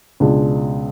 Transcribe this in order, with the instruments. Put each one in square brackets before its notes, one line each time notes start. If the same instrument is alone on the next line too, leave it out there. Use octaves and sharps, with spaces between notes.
[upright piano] C#2 B2 G#3 D4 G#4